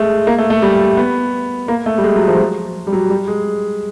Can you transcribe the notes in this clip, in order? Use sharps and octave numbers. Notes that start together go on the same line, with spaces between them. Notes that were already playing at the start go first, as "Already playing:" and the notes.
Already playing: G#3 A3
A#3
A3
A3
G3
B3
A#3
A3
G3
G#3
F#3
F3
F#3
G3
F#3
G3
G#3